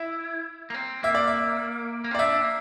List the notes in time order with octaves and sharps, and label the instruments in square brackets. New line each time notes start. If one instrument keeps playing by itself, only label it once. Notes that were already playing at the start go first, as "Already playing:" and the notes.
Already playing: [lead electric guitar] E4 [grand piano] E5
[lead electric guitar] A#3
C4
[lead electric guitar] A#3 [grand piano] E5
[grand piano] D5
E5
[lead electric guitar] A#3
C4
[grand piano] D5
[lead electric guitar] D4 [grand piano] E5
[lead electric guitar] A#3